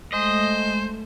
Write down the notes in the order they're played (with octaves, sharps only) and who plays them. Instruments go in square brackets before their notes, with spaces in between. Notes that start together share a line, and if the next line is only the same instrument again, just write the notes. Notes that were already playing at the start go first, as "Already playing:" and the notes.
[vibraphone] G#3 [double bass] A3 [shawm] C5 [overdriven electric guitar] D#5